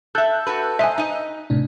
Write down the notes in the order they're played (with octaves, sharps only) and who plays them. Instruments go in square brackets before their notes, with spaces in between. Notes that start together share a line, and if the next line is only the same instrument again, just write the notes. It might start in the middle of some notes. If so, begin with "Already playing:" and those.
[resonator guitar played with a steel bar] A4 E5 [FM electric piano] E6 F#6 G6
[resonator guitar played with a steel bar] F#4 A4 B4
[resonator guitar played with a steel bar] C5 D#5 [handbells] E5 G#5
[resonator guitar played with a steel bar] D#4 D#5
[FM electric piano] A2 C3 D4